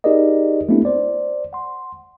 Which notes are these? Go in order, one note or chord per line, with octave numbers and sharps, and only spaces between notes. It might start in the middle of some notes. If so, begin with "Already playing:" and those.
D#4 G4 G#4 A#4 D5 D#5
A3 B3 C4 D4 E4 G4
C5 D5
F#5 C6